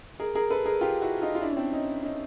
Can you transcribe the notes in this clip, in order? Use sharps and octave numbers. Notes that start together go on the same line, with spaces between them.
G#4 A#4
G#4 A#4
A4 B4
G#4 A#4
F4 G4
E4 F#4
D#4 F4
F4
D4 E4
C#4
C4 D4
C#4 D#4
C#4 D#4